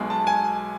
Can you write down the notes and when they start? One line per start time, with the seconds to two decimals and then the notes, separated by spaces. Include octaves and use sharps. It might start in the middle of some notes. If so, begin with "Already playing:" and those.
Already playing: B1 B2 G#3
0.10 A5
0.27 G#5